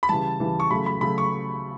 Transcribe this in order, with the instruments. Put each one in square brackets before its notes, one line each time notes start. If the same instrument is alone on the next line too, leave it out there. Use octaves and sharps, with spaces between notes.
[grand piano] B5
C#3 E3 G3 A5
C#3 E3 G3
C#6
C#3 F#3 A3 B5
B5
C#3 F#3 A3 B5
C#6